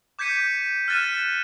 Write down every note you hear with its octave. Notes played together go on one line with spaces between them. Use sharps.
D6 G6 G#6 B6 C#7 D#7
F6 F#6 A6 D#7 E7